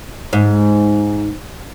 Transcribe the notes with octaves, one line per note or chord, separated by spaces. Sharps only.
G#2